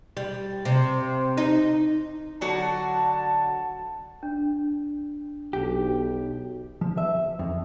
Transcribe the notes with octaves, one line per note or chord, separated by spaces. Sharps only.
G3
C3
D#4
D3 F#3 F#4 A5
D4
B1 G4
F3
E5
F2